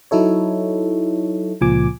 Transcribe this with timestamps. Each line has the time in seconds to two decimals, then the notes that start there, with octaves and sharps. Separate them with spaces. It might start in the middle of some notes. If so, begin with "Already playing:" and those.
0.11 F#3 D#4 E4 A4 C#5
1.61 C#2 A#2 F3 G#5 D6